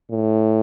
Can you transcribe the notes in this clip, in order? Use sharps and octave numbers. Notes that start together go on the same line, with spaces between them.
A2